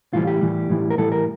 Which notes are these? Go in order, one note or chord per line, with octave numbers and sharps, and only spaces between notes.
A2 E3 G3 F4
G4
A2 E3 G3
A2 E3 G3
A#4
A2 E3 G3 A4
A#4